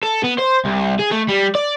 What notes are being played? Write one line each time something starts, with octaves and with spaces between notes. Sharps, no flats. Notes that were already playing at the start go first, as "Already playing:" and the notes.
A4
B3
C5
C2
G#4
A3
G3
D5